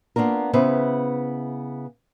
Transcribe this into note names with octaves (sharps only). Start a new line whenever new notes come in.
A#3 B3 D4 F4 A#4
C#3 B3 E4 B4 C5 E5